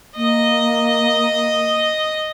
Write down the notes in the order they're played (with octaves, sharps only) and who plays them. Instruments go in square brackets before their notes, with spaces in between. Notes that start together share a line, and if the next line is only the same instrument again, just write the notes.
[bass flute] A#3 [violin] D#5